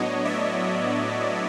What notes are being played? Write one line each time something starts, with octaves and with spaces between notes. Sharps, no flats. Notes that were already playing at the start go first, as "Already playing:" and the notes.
Already playing: A2 F#3 B3 D4 C#5 D#5
D5 E5